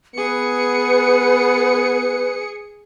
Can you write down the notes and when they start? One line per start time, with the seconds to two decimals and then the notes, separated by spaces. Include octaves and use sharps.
0.15 B3 G#4 B4 C#7